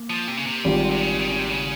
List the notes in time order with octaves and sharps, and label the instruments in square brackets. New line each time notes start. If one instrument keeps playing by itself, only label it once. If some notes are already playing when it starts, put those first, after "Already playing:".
Already playing: [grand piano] A#3
[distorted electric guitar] F3
C3
C#3
C3
[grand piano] G#1 G#2 G3 C4 F4
[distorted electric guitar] C3
C#3
D#3
C#3
C3
C#3